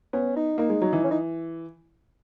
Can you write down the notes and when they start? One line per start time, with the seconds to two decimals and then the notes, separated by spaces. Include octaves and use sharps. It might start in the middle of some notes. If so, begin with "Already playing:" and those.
0.13 B3 C#4
0.36 D#4
0.58 A#3 D#4
0.69 G#3
0.82 F#3
0.93 E3
1.04 C#4
1.11 D#4